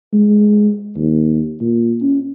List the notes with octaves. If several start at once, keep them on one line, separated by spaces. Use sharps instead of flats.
G#3
D#2
A#2
C#4